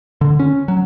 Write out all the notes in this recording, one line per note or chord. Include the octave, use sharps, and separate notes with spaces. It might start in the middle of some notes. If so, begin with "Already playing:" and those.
D3
C#4
F#3